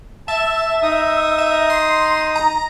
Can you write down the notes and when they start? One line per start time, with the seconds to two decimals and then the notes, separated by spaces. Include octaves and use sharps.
0.28 E5 A5
0.83 D#4 D#6
1.38 E5
1.70 C6
2.35 A#5